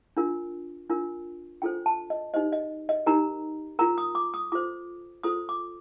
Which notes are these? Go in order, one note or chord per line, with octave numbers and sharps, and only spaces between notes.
D4 F4 A#4
D4 F4 A#4
D4 F4 A4 C5 G5
A5
D#5
D#4 G4 C5 D#5
D#5
D#5
D#4 G4 A#4 A#5
F4 A#4 A#5
D#6
D6
D#6
F4 A4 C5 D6
F4 A4 C5 D#6
D6